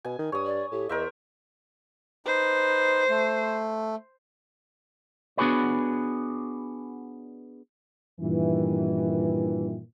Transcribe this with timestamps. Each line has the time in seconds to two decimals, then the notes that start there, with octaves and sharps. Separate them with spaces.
0.05 B2 G#5
0.19 D#3
0.32 G2 C#5 D#6
0.45 D5
0.72 A2 G4
0.89 E2 A#4 C5 D#5 E5
2.26 D#4 B4 C5
3.09 A3
5.37 B3 D4 F#4 G#4 B4 C#5
8.21 G2 A#2 D#3 E3